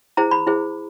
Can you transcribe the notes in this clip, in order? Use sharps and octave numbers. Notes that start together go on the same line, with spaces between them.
E4 G#4 C5 A#5
B5
E4 G#4 C5